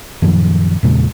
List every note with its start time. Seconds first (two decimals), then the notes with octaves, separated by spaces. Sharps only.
0.22 F#2 A#2 D#3 F3
0.83 E2 A#2 C#3 G#3